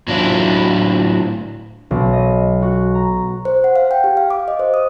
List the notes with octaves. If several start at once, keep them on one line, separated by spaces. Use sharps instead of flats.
A2 F#3 D4 E4 F4
B1
D#5
F#4
A#5
C5
F#5
F5
G5
G4
F5
D6
D#5
C5
D#6